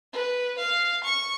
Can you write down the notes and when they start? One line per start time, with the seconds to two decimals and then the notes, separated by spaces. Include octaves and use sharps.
0.13 B4
0.58 F5
1.04 C#6